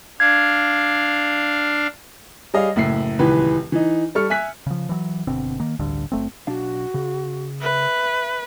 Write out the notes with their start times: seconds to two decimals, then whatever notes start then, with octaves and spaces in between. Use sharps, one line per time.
0.20 D4 F5 G#6
2.54 G3 G#4 C#5 D#5 F5
2.76 F#1 A2 E5 C7
3.19 D#1 C#2 E3 B4
3.72 E3 D#4
4.15 G3 A4 C#6 F6 C#7
4.30 E5 G#5 F#6 B6
4.67 C#3 F3
4.89 E3 F#3
5.27 F#1 B2 D3 C4
5.60 D#3 A#3
5.79 A1 D2 G2 D3
6.12 F#1 A3 C4
6.47 B1 D4 F#4 F5
6.94 C#3
7.61 B4 E5